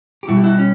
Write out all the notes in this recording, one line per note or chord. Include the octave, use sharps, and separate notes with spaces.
G4
B2 G3 E4 F#4
G4
E4 F#4
C#4